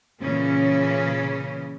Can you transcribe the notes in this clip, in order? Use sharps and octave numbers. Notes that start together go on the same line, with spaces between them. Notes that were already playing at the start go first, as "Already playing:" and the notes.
A#2 C#3 E3 C#4